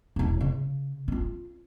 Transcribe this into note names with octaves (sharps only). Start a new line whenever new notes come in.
E1 E4
C#3
C4 F4